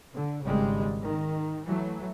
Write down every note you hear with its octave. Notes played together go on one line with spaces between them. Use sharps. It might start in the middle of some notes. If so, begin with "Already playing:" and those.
D3
G#1 C#3 G3 G#3
D#3
E3 F#3 A3